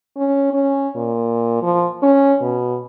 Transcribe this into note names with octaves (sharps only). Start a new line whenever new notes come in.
C#4
C#4
A#2
F3
C#4
B2